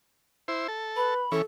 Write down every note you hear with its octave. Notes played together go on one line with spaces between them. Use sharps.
E4 C5
A4
B4 B5
E3 C#4 A4